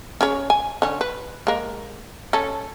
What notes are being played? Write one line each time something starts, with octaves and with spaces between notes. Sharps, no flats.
C#4 G#4 C#5
G#5
D3 C#4
B4
G#3 A#3
C#4 A4